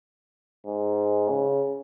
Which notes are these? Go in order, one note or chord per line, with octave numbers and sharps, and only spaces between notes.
G#2
C#3